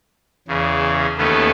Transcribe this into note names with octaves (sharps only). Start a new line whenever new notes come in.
E2 C#3
D#2 A3 B3 C#4